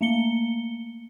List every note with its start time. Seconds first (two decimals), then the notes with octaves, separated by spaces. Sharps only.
0.01 A3 A#3 C#7 G7